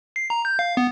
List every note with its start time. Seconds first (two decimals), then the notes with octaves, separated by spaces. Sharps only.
0.16 C7
0.30 A#5
0.45 G6
0.59 F5
0.77 B3